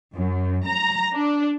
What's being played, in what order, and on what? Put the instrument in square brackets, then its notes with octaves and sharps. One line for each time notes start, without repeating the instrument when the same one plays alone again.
[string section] F#2
A#5
D4